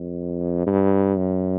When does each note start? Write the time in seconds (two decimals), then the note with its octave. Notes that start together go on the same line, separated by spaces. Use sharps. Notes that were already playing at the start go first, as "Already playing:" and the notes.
Already playing: F2
0.66 G2
1.18 F#2